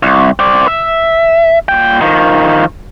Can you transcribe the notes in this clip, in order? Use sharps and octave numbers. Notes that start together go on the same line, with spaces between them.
C2
C4 D5
E5
A#2 G5
D#3 F3